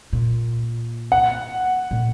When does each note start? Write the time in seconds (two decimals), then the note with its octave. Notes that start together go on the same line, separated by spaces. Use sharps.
0.13 A#2
1.12 F#5
1.91 A#2